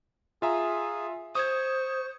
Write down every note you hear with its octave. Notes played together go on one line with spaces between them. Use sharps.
F4 G#4 E5 A#5
C5 C#6 D#6 G#6